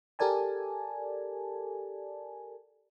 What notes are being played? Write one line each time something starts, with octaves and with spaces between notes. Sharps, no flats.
G4 A4 A#4 D5 G#5 A5